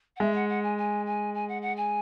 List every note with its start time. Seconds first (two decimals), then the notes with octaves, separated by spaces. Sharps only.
0.16 F#5
0.20 G#3 E5
0.34 F#5
0.49 F#5
0.63 G#5
0.77 G#5
1.05 G#5
1.34 G#5
1.48 F#5
1.62 F#5
1.76 G#5